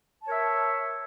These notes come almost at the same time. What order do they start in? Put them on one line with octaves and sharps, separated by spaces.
A5 C#5 A#4 E5